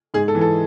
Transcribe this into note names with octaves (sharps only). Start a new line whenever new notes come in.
G#2 G#4
A4
E3
A4